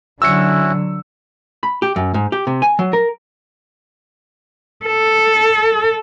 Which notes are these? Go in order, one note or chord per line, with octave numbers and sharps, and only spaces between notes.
D3 F#3 C#4 E4 F#4 E6 C#7
B5
G4
F#2
G#2
G4
C3
G#5
F#3
A#4
A4